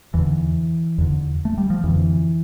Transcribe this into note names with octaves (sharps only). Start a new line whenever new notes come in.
E2 D3 E3
E2 D3
A3
G3
F3
F2 D3 E3